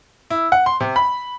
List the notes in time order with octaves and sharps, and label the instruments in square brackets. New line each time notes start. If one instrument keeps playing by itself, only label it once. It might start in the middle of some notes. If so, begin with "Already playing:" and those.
[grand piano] E4
F#5
C6
C3
B5